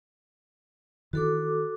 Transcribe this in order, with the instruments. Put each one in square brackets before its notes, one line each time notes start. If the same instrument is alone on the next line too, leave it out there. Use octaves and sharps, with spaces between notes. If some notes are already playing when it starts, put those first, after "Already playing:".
[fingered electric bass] D#3 E3 [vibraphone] F#4 A4 D6